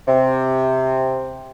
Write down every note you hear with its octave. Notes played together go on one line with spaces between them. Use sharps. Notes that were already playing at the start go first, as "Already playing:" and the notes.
C3